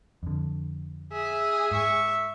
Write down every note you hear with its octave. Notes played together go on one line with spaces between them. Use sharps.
F2 D3
G#4 E5
G#2 E5 C#6